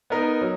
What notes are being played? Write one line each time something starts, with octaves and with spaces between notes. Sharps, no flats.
B3 D#4 A#4
F#3